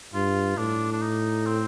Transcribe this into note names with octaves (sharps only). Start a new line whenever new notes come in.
G2 F4
A2 D4
D4
D#4
C4